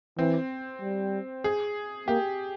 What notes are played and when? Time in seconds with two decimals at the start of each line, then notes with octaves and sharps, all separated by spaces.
0.18 E3 C4
0.81 G3
1.44 G#4
2.08 A#3 G4